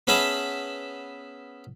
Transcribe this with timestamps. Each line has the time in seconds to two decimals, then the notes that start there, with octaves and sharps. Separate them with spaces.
0.07 B3 C#4 G#4 E5 A5 B5